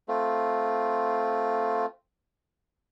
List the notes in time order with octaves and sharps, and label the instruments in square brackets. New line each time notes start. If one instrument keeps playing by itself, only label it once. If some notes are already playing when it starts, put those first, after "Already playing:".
[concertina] A3 C4 F4